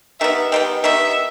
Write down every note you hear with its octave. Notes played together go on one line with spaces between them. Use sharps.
D#3 G3 B3 E5
D#3 G3 B3 G5
D#3 G3 B3 E5